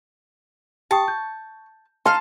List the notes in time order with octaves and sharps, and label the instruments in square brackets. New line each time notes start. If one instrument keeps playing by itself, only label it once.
[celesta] G4 G5 D#6 [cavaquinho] A5 [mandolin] C#6
[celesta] G6
[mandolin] D#4 F5 [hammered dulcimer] A5 [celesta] C6